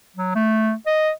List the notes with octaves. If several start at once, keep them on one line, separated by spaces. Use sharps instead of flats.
F#3
A3
D#5